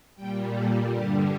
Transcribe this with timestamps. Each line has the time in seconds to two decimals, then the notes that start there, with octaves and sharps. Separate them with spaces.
0.15 A#2 G3 G5
0.53 A4
0.90 G2 D3 G3 G4